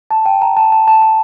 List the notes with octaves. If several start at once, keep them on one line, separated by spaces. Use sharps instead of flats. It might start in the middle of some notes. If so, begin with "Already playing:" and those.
A5
G5
A#5
A5
A5
A5
A5